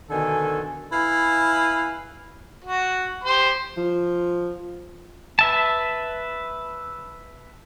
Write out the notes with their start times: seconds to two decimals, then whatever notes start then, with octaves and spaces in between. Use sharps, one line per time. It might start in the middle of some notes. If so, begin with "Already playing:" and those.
0.10 B2 D3 D#3 A4 G#5
0.91 E4 B4 F5 G#5
2.65 F#4
3.24 G4 C5 C6
3.77 F3
5.39 B4 E5 A5